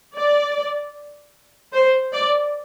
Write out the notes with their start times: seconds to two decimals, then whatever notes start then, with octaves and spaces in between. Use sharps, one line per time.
0.15 D5
1.73 C5
2.13 D5